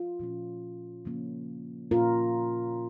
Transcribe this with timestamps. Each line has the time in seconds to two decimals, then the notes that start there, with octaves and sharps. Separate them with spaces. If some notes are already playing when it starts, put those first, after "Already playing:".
Already playing: F4
0.19 A#2 F3 C#4
1.05 C#3 F3 A#3 C#4
1.91 A#2 A#3 C#4 F4 A#4